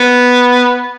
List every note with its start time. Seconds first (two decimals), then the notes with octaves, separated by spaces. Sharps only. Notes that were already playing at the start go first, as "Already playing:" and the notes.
Already playing: B3